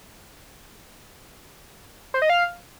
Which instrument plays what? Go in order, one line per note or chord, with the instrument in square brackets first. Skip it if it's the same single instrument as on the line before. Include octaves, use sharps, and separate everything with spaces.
[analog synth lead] C5
D#5
F5